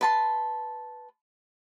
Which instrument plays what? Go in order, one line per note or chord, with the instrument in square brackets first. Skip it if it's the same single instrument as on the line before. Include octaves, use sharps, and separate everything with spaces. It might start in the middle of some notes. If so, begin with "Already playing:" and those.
[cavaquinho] B4 A5 C6